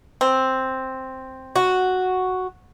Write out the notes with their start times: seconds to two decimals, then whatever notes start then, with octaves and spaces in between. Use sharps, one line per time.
0.21 C4
1.56 F#4